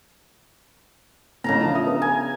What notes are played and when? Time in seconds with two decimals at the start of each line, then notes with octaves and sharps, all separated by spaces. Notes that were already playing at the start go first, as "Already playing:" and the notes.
1.44 A1 A2 C#3 A5 A#5
1.59 F3 D4
1.75 E5 D#6
1.87 B3 D4
2.02 G#5